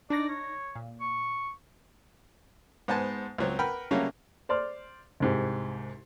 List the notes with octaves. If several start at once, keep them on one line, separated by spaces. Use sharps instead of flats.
D4 D#4 D5 A#6
C#5
A#2
C#6
G#2 B3 C5 G#5 A5
C#2 F#3 C4
A#4 B4 F#5 G5 B5 F6
C#3 F#3 G3 A3 A#3 C#4
C5 D5 C6 F6
C2 G#2 G4